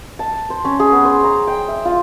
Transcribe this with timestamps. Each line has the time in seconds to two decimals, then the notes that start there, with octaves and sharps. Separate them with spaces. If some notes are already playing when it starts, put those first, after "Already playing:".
0.19 A5
0.50 C5
0.65 C#4
0.80 G#4
0.92 B3
1.05 C5
1.24 A#5
1.47 G5
1.68 E5
1.85 F4